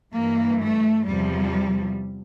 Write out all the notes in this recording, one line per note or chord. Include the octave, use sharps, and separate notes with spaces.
G2 E3 A#3
A3
E2 C3 F3 G3